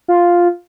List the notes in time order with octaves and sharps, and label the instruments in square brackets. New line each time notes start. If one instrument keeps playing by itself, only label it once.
[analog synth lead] F4